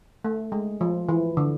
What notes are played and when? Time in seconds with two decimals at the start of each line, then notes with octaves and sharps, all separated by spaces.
0.24 A3
0.52 G#3
0.81 F3
1.09 E3
1.37 D3